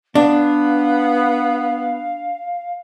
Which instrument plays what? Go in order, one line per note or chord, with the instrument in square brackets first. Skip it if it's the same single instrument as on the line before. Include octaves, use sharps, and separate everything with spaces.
[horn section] B3 [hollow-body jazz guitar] D4 [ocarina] F5